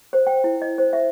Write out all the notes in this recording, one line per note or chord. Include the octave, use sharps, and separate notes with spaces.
C5
G5
E4
D#5
C5
E5